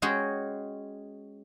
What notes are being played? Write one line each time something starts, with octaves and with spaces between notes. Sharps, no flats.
G#3 C#4 F#4 G#4 G5